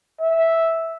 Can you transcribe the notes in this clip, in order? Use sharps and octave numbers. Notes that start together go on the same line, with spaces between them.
E5